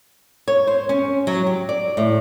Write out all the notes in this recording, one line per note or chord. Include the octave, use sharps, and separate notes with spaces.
C#5
C5
C#4
F#3
G4
D5
A2